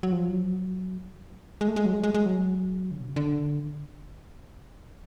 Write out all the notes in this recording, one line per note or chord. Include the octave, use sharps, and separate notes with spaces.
F#3
F3
F#3
G#3
A3
G#3
F#3
G#3
G#3
G#3
F#3
D3
B2
C#3
D3